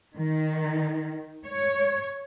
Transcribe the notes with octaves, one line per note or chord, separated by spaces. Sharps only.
D#3
C#5